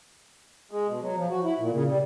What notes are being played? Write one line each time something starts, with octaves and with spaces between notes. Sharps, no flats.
G#3
B2
F#3
F3
F#4
E4
A#2
C#3
G3